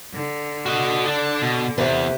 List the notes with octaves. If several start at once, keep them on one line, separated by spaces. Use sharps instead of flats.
D3
F#4 D#5
D4
B2
E2 C3 B4